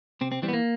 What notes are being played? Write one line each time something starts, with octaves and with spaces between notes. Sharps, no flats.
C3 C4
C4
E3 G3 C4
B3
A#3